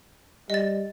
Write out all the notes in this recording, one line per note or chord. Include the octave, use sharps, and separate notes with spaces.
G3 D#5 A6